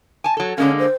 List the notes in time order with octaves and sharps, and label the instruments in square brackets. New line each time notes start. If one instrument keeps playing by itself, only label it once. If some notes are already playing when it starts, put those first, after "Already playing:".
[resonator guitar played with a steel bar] G#5 A5
F#3 A4
[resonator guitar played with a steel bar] D3 G#3 A#3 [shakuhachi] C#4
[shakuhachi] C5